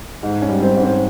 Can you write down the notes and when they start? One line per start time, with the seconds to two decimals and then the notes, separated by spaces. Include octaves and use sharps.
0.23 G#2
0.42 C#4
0.49 G3
0.62 C4
0.76 G#2
0.83 C4